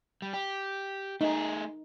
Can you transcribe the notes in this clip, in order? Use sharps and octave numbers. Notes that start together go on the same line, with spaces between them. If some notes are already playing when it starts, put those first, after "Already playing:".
G3
G4
A3 D#4 G#4